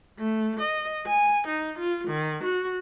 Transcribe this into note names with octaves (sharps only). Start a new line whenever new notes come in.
A3
D#5
G#5
D#4
F4
D#3
F#4